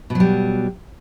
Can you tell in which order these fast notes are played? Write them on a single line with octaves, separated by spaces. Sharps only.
B2 F#3 G3